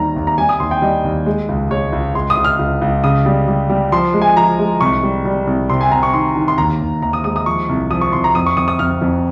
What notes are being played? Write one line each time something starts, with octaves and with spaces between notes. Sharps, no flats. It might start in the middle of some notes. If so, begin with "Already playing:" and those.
Already playing: D#2 D#3 G3 A#5
D#2
A#5
G3 G#5
D#6
D#2 C6
G5
G3 D#5
D#2
G#3
C#2
G#3 C#5
C#2
C#2 C6
D#6
C#2
F6
C#2
C#2
C#3 D#6
G3
G3
G3
F3 C6
G#3
G#5
F3 A#5
G#3
C2 C#6
G3
G3
C2
C3 C6
G#5
C3 A#5
C#6
D#3 C6
D#3
C6
D#2 A#5
D#2
D#2 A#5
D#6
G#3 D#6
D#6
F3 C#6
C2
F3 D#6
C#6
C2 C6
A#5
F2 D#6
C#6
F2 D#6
D#6
F2 F6
F2